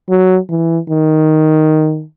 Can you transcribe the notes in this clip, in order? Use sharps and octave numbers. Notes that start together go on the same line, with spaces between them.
F#3
E3
D#3